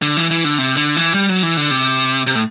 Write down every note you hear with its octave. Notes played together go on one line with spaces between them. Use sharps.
D3
E3
E3
D3
C3
D3
E3
G3
F#3
E3
D3
C3
C3
A2